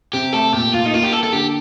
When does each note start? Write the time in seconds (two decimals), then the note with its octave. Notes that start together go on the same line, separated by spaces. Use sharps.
0.13 C3 G4
0.33 A3 A4
0.53 A#2 G4
0.73 A#2 F4
0.86 D#4
0.93 A#3 F4
1.03 G4
1.13 A#3 A4
1.24 A4
1.33 D3 G4